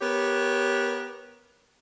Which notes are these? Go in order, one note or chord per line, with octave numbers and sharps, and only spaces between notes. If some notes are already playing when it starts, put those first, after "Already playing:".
B3 G4 A#4 C#5